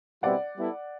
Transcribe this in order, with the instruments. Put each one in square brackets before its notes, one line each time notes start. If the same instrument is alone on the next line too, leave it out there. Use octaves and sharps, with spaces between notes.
[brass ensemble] B2 G3 C4 E4 [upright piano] D5 F#5
[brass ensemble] G3 B3 E4 A4